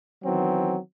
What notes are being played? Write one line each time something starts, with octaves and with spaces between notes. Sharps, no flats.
D#3 E3 F#3 B3 C4